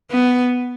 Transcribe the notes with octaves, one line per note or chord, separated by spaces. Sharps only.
B3